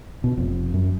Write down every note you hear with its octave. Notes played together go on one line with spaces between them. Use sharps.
B2
F1
F#2